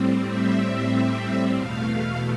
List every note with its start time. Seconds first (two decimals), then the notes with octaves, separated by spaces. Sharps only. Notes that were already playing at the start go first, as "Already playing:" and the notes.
Already playing: A2 G3 C4
0.26 E5
1.55 E2 B2 A3 F5
1.88 F5